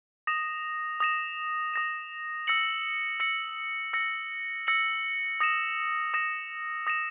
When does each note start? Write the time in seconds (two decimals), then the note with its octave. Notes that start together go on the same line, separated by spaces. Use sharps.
0.27 D#6 A#6 E7
1.00 D#6 A#6 E7
1.74 D#6 A#6 E7
2.47 E6 A#6 C#7 F#7
3.20 E6 A#6 C#7 F#7
3.93 E6 A#6 C#7 F#7
4.67 E6 A#6 C#7 F#7
5.40 D#6 A#6 E7
6.14 D#6 A#6 E7
6.87 D#6 A#6 E7